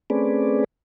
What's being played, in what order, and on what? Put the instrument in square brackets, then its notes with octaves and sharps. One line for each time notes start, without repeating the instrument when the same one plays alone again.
[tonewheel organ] A3 C4 C#4 G#4 B4 D5